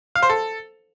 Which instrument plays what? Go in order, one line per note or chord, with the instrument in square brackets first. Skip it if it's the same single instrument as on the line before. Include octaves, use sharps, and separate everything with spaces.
[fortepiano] F5
C5
A4